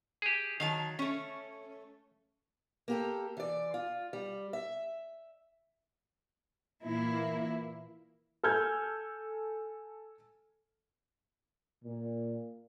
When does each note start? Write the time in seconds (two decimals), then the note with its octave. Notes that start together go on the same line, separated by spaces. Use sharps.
0.22 G4 G#4
0.60 D#3 F#3 F5 A5
0.99 A3 C#4
2.88 A#3 G4 A4
3.37 E3 D5
3.74 F4
4.13 G3
4.53 E5
6.84 A#2 E3 A#3 E4
8.43 A4 G#5 F6 G6 G#6
11.85 A#2